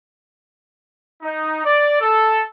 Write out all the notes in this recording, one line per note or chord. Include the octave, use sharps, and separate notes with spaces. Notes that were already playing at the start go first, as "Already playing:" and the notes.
D#4
D5
A4